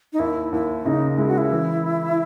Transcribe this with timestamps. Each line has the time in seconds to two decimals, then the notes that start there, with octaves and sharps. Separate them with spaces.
0.13 D#4
0.19 D#2 E4
0.52 D#2 E4
0.86 C#3 D#4
1.18 G#3 E4
1.28 F#4
1.38 E4
1.51 E3